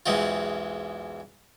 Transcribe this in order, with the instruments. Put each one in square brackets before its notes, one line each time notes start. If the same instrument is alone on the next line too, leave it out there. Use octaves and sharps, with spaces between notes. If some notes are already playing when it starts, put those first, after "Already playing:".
[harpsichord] B1 E2 G#3 C4 F4